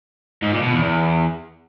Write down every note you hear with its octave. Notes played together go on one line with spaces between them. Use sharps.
G#2
A#2
B2
E2
E2